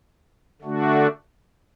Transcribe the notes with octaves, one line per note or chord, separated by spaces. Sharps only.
D3 A3 D4 F#4